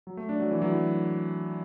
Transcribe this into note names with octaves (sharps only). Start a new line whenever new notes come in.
F#3
A3
D4
F#3
E3
F#3
E4